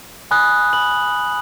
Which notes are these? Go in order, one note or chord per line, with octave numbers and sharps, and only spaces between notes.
G#5 B5 D#6 F#6
B5 F#6 F#7